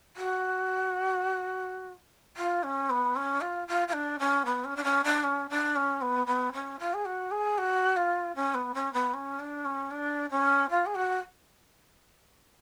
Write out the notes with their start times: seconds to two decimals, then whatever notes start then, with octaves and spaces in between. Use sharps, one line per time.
0.16 F#4
2.37 F4
2.63 C#4
2.90 B3
3.15 C#4
3.41 F4
3.68 F4
3.88 F4
3.93 D4
4.19 C#4
4.45 B3
4.64 C#4
4.76 D4
4.84 C#4
5.04 D4
5.23 C#4
5.49 D4
5.76 C#4
6.01 B3
6.26 B3
6.53 C#4
6.79 F4
6.93 G#4
7.05 F#4
7.31 G#4
7.58 F#4
7.96 F4
8.35 C#4
8.54 B3
8.74 C#4
8.93 B3
9.13 C#4
9.39 D4
9.65 C#4
9.90 D4
10.30 C#4
10.70 F4
10.86 G#4
10.95 F#4